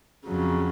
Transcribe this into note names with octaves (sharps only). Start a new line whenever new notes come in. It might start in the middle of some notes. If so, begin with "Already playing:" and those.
F2 C#3 F#3